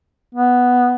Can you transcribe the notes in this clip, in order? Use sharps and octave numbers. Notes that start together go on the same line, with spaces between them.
B3